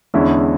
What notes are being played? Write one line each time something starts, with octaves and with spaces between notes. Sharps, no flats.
E2 D3 G#3 C#4 E4